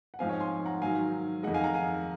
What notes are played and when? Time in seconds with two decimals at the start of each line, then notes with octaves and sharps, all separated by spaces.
0.14 F#5
0.19 G#2 F3 C4 F5 G#5
0.29 C#5 F5
0.40 G#5 C6
0.66 F#5 A#5
0.81 G#2 D#3 F#3 F5 G#5
1.43 F2 D#3 G#3 D#5 F#5
1.54 F5 G#5
1.64 F#5 A#5
1.74 F5 G#5